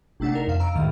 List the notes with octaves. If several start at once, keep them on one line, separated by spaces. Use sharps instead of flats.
G1 C3 A3 D4 F#5
D4 D#4 A#4
F2 F5 E7
F5 A#5 E6 D7
C#2 A2 D#3 F6